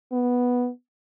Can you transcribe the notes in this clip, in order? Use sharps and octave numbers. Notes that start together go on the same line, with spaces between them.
B3